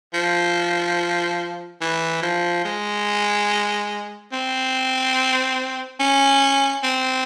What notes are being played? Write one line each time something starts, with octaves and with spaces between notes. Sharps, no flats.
F3
E3
F3
G#3
C4
C#4
C4